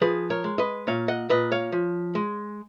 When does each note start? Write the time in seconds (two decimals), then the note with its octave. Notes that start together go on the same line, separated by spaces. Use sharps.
0.01 F3 G#4 B4
0.30 A#4 C#5
0.44 G#3
0.58 B4 D#5
0.87 A#2 C#5 F5
1.08 D#5 F#5
1.29 A#2 B4 D#5
1.52 C#5 F5
1.72 F3
2.15 G#3